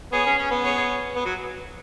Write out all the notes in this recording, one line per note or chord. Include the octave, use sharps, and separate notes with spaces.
B3 G#4 C#5
C#4
C#4
B3
G#4 C#5
B3
F#3